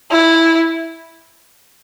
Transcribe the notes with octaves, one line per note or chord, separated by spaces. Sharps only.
E4